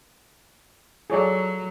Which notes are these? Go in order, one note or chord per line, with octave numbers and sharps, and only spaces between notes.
F#3 F4 G#4 A4 C#5 D5